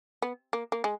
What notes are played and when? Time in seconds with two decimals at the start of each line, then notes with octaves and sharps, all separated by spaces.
0.22 B3
0.53 A#3
0.72 A#3
0.84 G#3